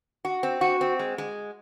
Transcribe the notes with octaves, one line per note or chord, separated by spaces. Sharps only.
F#4
C4
F#4
C4
G#3
G#3